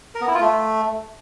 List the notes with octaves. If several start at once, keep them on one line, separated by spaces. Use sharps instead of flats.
A#4
B3
E4
F4
A3